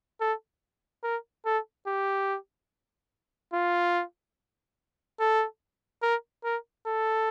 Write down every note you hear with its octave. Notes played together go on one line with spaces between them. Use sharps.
A4
A#4
A4
G4
F4
A4
A#4
A#4
A4